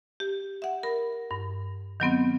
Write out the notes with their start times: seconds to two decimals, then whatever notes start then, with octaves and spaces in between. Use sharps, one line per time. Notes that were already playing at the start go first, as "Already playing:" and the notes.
0.20 G4
0.62 E5 F#5
0.83 A#4 B5
1.31 G2
2.00 D#3 F#3 B3 C4